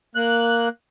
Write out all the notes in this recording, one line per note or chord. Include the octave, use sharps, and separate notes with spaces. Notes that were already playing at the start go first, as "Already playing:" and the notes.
A#3 F#6